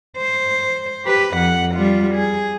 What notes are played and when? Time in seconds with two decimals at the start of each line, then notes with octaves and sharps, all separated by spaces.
0.17 C5
1.05 G4 B4
1.35 F2 F#5
1.75 G3 F4
2.15 G#4